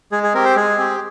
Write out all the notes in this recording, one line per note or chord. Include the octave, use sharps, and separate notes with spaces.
G#3 G#4
G#4
C4 G4 A#4
C5
G#3 G#4
C4 G4